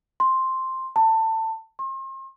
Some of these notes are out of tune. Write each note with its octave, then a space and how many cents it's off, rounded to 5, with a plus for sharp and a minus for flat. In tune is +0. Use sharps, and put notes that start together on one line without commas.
C6 +5
A5 +20
C6 +40